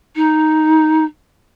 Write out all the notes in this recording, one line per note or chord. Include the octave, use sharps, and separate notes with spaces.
D#4